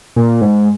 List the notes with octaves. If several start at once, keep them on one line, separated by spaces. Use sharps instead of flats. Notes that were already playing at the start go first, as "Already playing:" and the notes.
A#2
G#2